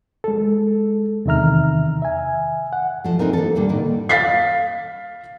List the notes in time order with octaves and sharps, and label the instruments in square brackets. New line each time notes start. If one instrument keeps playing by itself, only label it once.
[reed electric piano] G#3 A4
E2 C3 D#3 E5 A#5 F6
E5 G#5
F#5
[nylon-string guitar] F3 A3
E3 C4 D#4 A#4
A#3 A4
A#2 D3 G3 A#3
A2 D#3
[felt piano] F5 A6 B6 C7